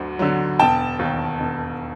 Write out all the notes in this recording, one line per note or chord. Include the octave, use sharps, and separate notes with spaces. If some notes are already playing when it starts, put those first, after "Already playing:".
Already playing: D2 D3 F#3
D3 F#3
E1 G5 A5
D#2 D#3
E1